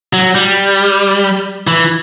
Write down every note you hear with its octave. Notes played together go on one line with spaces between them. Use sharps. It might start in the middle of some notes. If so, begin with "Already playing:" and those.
F#3
G3
E3